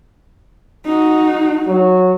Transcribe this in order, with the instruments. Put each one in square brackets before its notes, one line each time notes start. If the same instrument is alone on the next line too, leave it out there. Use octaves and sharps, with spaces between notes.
[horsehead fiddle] D#4 F#4
[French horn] F#3